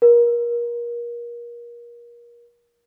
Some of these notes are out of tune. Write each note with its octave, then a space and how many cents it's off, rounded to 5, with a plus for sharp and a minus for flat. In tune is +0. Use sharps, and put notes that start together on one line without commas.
A#4 +30